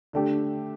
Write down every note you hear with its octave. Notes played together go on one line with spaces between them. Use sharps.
D3 A3 D4 G4